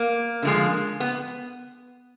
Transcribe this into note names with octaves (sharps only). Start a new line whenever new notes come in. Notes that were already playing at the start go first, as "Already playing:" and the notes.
Already playing: A#3
D3 F3 G#3
B3